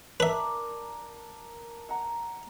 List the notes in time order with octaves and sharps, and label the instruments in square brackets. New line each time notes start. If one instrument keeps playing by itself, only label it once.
[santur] D4 A#4 [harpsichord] B4 E5
[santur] F#5 A#5